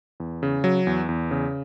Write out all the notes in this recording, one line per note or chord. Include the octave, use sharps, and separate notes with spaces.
E2
C#3
F#3
E2
E2
C#3